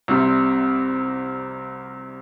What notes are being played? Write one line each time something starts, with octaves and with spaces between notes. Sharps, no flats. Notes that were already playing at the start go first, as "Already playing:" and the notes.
C2 C3 G3 C4